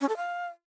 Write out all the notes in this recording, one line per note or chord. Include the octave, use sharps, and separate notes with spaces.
C#4
A4
F5